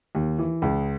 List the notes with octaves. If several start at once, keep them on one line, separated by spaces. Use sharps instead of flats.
D#2
E3
C#2